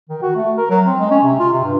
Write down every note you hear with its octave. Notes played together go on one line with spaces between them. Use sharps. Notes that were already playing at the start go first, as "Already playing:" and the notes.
D#3
F#4
A3
A#4
F#3
C4
G#3
C#4
C3
F4
C3
G2